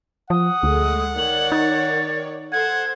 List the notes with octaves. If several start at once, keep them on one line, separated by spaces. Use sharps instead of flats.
F3 F#5 D#6
D2 G#3 A3
D#3 C#5 D5 F#7
D#4 A6
A4 C5 F#5 G#6